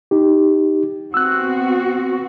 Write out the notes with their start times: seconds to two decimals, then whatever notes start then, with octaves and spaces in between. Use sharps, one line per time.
0.11 D#4 G4
1.14 B3 C4 F#4 E6 F#6